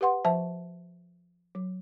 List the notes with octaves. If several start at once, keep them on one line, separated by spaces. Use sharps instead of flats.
G4 B4 F#5 C6
F3 E5 A5
F#3